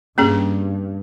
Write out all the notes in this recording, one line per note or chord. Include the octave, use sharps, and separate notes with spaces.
G2 A#3 C#4 G#4